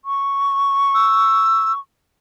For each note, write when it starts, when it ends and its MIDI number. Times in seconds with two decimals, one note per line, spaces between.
0.05 1.79 85
0.94 1.72 88